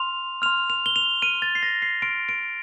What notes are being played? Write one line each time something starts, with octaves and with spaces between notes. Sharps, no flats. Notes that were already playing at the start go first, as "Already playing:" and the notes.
Already playing: C6 F6 F7
C6 F6 F7
F7
G7
F7
C6 F6 D#7
A6
C7
A#6
C7
C6 F6 D7
D7